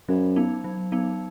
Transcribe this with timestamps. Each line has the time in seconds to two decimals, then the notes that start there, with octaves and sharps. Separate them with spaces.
0.08 F#2 F#3
0.36 B3 D#4
0.64 F#3
0.92 B3 D#4